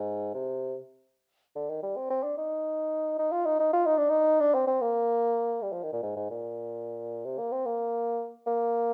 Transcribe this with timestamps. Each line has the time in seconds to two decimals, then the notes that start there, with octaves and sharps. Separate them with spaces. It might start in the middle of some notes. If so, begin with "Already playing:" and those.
Already playing: G#2
0.34 C3
1.56 D3
1.69 D#3
1.83 G3
1.97 C4
2.10 C4
2.24 D4
2.37 D#4
3.19 D#4
3.32 F4
3.46 D#4
3.59 D#4
3.73 F4
3.86 D#4
3.98 D4
4.09 D#4
4.40 D4
4.54 C4
4.68 C4
4.82 A#3
5.62 G3
5.72 F3
5.83 D#3
5.93 A#2
6.03 G#2
6.16 G#2
6.31 A#2
7.25 C3
7.38 A#3
7.52 C4
7.66 A#3
8.47 A#3